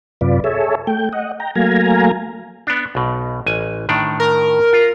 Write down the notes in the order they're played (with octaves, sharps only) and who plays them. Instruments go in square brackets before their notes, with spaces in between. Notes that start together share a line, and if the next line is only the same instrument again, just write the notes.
[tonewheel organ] F#2 C3 F4 B4 D5
G#4 A4 C#5 E5
A3 G5
D#5 F#5
G5 A#5
F#3 A3 A#3 F5 G#5 A#5
[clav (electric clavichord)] B3 D4
B1 B2
A1 G#5
A2 D#3 D4
[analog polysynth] A#4
[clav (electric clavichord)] F4